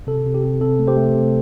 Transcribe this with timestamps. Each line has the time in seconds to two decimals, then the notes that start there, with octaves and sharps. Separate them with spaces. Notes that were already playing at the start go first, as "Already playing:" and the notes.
0.07 C3 A4
0.26 C3
0.34 G4
0.44 C3
0.61 C3 A4
0.79 A3
0.88 G4 C5
0.97 A3
1.14 C3